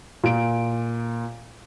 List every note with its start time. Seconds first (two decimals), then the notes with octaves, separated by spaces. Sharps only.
0.24 A#2 D7